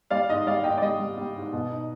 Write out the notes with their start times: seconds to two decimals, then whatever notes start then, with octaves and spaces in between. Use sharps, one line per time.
0.10 G3 D5 F5
0.29 G#2 D#5
0.46 G3 D5 F5
0.64 G#2 D#5 G5
0.78 D5
0.82 G3 D#5
0.99 G3
1.17 G3
1.35 G#2
1.53 B2
1.71 D#4